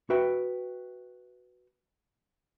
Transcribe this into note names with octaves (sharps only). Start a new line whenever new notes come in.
F#4 B4 E5 G5